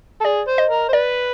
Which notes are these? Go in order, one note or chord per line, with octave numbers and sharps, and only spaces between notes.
A4
G#4 D5
C5
D#5
A#4
C5
B4 D5